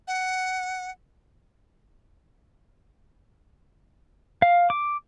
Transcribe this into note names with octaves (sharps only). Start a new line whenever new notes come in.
F#5
F5
D6